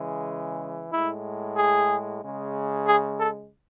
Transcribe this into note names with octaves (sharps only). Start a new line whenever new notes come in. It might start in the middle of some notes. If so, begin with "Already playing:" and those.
Already playing: C#3 E3 G#3
A2 G#3 E4
G#4
C#3 G#3
G#4
A4